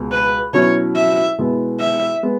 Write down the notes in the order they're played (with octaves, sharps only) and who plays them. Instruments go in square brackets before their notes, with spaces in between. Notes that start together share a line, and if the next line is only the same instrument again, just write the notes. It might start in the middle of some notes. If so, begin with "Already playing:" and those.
Already playing: [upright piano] C#2 B2 G#3
[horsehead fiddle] B4
[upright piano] B2 F#3 C#4 E4 [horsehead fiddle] C#5
[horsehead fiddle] E5
[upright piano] B2 G#3 B3 E4
[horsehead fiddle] E5
[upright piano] G#3 B3